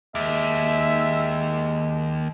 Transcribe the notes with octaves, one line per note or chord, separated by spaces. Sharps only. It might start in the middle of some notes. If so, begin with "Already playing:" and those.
D#2 G#3 E5